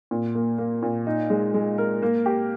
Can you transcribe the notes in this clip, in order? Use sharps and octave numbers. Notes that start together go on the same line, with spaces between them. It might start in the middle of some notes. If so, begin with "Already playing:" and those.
A#2
A#3
A#3
A#2
D#4
G#3
G#3
A#4
A#3
G4